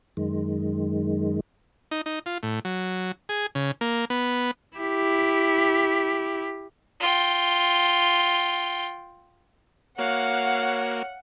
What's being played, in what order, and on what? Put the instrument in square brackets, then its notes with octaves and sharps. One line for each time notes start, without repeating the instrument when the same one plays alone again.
[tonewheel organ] F#2 D#3 G#3
[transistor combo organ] D#4
D#4
F4
A2
F#3
G#4
C#3
A#3
B3
[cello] E4 G4
[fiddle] F4 G5
[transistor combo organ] A#3 F#4 [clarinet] C#5 [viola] F5 [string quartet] F#5